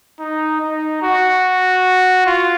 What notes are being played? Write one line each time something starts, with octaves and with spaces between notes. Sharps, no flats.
D#4
D#4
F#4
F4